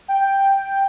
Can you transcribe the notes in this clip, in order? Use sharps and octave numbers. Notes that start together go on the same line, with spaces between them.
G5